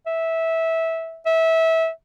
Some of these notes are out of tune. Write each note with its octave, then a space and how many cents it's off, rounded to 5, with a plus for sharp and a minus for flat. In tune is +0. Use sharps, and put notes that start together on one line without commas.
E5 -15
E5 -20